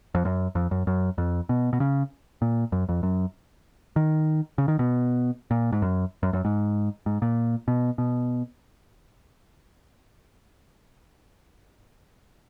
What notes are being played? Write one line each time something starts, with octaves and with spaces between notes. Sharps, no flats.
F2
F#2
F2
F#2
F#2
F2
B2
B2
C#3
A#2
F#2
F2
F#2
D#3
C#3
D#3
B2
A#2
G#2
F#2
F#2
F#2
G#2
G#2
A#2
B2
B2